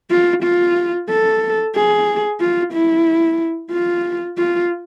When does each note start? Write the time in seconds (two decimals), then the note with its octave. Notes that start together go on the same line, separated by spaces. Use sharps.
0.11 F4
0.44 F4
1.10 A4
1.75 G#4
2.40 F4
2.73 E4
3.72 F4
4.38 F4